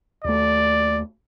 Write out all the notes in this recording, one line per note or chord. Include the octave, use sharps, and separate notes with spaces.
D#2 A3 D5